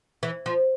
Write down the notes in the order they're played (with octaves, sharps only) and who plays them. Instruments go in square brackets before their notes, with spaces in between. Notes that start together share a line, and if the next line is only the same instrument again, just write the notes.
[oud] E3
F3